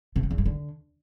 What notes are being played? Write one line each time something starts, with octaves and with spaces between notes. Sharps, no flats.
C3
C#3
E2
G2
D3